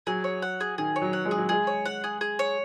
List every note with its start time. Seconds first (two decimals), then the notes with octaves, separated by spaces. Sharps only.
0.07 F#3 G#4
0.24 C#5
0.42 F#5
0.61 G#4
0.78 D#3 G#4
0.96 C#5
1.02 F#3
1.13 F#5
1.25 G#3
1.31 G#4
1.38 F#3
1.49 G#3 G#4
1.67 C#5
1.86 F#5
2.04 G#4
2.21 G#4
2.39 C#5